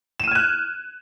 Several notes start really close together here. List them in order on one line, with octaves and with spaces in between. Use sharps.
E7 D#7 F6 G#6 F#6